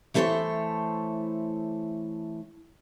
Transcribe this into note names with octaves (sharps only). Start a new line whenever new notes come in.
E3 A3 E4 A4 C5 C#5